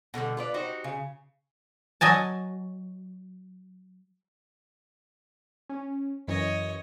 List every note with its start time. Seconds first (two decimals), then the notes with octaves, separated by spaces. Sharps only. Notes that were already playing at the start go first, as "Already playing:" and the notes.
0.14 B2 D3 D#3 G3
0.37 F4 B4 D5
0.54 D#4 F#4 G4 C5
0.84 C#3
2.01 F#3 D#5 G#5 A5
5.69 C#4
6.28 F#2 E3 C#5 D#5